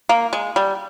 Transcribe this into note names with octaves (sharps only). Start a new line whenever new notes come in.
A#3
G#3
G3